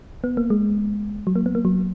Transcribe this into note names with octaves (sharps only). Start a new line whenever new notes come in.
B3
A#3
G#3
F#3
A#3
B3
A#3
F#3